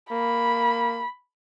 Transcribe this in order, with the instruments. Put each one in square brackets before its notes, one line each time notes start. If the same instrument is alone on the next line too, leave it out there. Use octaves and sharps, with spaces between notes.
[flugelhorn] A#3 [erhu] B5